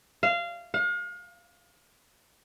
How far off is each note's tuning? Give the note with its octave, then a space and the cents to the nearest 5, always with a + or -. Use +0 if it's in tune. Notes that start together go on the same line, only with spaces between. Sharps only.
F5 -20
F5 +40